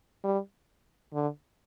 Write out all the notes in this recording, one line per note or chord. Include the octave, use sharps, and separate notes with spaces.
G3
D3